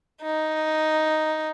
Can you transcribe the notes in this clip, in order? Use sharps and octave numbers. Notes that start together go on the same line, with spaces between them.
D#4